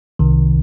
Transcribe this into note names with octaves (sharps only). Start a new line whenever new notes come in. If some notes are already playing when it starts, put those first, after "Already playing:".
C2 C3 D#3